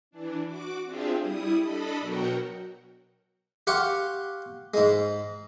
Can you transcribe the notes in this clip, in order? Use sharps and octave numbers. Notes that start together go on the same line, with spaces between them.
E3 D4
F#4 D6
C4 D4 F4 G4 G#4 E5
G3 E4 D#6
D4 A4 D#5 B5
B2 F#3 F#4 A#4 F#5 G5
G4 F5 F#5 C6 C#6
G#2 G#3